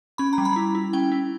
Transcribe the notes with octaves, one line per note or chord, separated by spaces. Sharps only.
C#4 B5
A#5
G3
B5
E4
E4
C#4 G5
E4